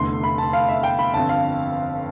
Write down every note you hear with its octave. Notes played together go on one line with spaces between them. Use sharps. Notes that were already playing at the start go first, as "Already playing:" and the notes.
Already playing: F1 E2 D3 A3 C6
B5
A5
F5
E5
G5
B5
G1 F2 D3 A5
F5